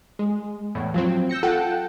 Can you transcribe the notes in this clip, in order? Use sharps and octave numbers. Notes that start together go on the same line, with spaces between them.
G#3
E2 A2
F3 F#3 C4
E6 G6 A#6 C#7
F4 A4 F#5 G5